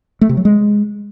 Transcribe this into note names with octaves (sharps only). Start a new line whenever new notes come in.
A3
C3
F#3
G#3